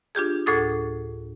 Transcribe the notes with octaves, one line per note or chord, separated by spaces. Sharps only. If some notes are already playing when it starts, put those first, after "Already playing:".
D4 F4 G4 G#4
D2 A2 G#4 A4 D6 D#6